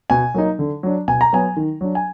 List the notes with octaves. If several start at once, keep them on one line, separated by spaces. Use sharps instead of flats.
B2 G#5
F#3 A#3 D#4
D3
F#3 D4
B2 G#5
A#5
F#3 B3 G#5
D#3
F#3 D4
G#5